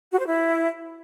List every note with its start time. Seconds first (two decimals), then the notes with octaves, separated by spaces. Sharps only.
0.11 F#4
0.19 C5
0.27 E4